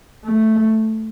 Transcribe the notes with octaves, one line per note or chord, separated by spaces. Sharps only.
A3